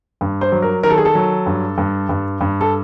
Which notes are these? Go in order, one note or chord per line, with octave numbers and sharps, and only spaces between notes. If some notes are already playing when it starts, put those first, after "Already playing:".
G2
C5
F#3
A#4
D#3 A#4
A4
G#4
A4
F#3
G2
G2
G2
G2
A4